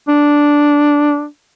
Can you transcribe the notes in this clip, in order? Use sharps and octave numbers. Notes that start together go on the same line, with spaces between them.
D4